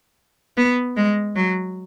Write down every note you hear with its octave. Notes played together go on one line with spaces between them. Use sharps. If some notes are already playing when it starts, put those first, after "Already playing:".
B3
G#3
F#3